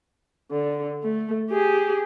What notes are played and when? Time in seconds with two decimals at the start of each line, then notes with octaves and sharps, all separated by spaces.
0.51 D3
1.03 A3
1.50 G4 G#4